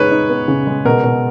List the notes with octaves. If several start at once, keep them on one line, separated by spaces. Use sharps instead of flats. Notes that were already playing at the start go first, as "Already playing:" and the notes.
Already playing: C#3 G#3 B3 D#4 B4 C#5
D#4
B3
C#3
G#3
B2 A#4
B2